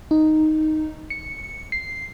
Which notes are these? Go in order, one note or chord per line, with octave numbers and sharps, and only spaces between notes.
D#4
C#7
C7